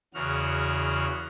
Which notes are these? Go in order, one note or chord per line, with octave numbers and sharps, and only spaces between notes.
E2 C#3 F#4 F6